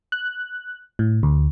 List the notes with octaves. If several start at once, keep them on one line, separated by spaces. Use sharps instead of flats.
F#6
A2
D2